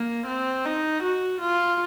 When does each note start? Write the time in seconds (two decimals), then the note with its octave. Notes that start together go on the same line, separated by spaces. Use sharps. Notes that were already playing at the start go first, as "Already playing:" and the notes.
Already playing: A#3
0.26 C4
0.65 D#4
1.03 F#4
1.41 F4